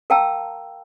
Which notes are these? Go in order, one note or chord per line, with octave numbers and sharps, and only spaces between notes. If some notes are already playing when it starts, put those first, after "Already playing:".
A#4 F5 G5 A5 A#5 E6